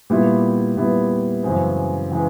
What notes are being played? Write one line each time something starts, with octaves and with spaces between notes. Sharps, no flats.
A#2 G3 B3 E4
A#2 G3 B3 E4
F#2 C#3 E3 G#3 C4
C#3 E3 G#3